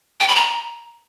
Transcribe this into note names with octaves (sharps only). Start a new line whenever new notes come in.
G5
B5
A#5